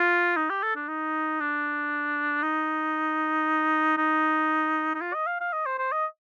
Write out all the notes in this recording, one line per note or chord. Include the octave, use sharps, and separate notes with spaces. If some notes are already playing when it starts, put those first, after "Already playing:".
Already playing: F4
D#4
G4
A4
D4
D#4
D4
D#4
D#4
D#4
F4
D#5
F5
F5
D#5
C5
C5
D#5